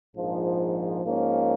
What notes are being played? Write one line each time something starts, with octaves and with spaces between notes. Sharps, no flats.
A#1 G#2 F3
G#2 F3 A#3 C#4